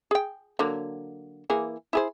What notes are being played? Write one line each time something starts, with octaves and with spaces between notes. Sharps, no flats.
G#4 G5
D3 F#3 A#3
E3 A#3 G#4
E4 G#4 C5